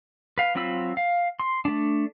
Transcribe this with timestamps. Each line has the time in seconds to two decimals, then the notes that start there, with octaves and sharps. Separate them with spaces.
0.38 B4 F5
0.55 F#3 C4 F4 B5 E6
0.97 F5
1.40 C6
1.65 A3 D4